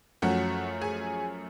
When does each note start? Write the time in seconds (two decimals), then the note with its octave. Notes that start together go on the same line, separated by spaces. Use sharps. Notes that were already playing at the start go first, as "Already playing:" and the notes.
0.22 F#2 F3 A3 C#4 F#4 F#5
0.81 G#4 G#5